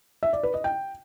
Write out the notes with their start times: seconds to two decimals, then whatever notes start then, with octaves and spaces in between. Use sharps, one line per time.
0.23 E5
0.33 D5
0.43 B4
0.54 D#5
0.64 G5